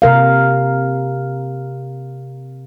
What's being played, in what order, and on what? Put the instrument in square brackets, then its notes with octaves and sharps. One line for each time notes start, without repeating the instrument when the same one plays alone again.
[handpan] C3 A#4 F5